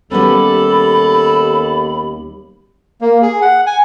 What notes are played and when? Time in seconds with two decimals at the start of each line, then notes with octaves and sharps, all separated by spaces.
0.11 D#2 G3 B3 C#4 A4 B5
3.01 A#3
3.22 G#4
3.42 F#5
3.66 G#5